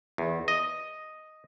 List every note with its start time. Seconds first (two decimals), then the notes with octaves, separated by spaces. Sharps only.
0.18 E2
0.48 D#5